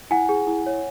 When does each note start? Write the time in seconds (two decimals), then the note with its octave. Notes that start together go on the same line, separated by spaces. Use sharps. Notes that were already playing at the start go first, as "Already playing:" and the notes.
0.11 E4 F#5 G#5
0.29 G#4
0.47 E4
0.66 C#5